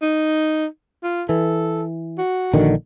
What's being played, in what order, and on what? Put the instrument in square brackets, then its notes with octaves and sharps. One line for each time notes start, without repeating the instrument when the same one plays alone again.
[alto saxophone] D#4
F4
[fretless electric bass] E3 [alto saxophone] A4
[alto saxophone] F#4
[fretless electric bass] A#1 D3 D#3